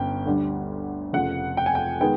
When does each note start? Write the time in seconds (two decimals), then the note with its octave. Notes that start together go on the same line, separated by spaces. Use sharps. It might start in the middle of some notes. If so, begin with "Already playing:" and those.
Already playing: G1 C#4 G5
0.26 D2 D3 G3
1.13 F1 F2 C#3 F3 F#5
1.57 G5
1.66 G#5
1.75 G5
2.01 D#3 G#3 B3 G5